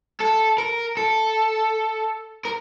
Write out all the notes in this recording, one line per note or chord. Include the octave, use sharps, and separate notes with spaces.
A4
A#4
A4
A#4